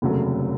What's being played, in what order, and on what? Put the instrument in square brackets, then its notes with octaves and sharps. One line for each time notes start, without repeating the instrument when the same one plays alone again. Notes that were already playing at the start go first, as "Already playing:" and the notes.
[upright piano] F1 D#2 C#3 F#3 A3